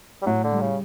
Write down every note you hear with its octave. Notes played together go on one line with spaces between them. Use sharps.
G3
A2 F#3
D3
G3
C#3